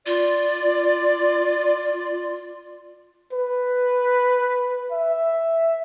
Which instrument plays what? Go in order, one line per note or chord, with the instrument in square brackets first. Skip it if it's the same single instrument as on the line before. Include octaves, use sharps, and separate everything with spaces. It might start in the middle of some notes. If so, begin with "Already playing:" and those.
[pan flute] F4 [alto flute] D5
[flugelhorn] B4
E5